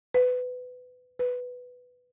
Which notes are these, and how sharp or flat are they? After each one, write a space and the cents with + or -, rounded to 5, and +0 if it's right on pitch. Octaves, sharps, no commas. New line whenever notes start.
B4 +20
B4 +5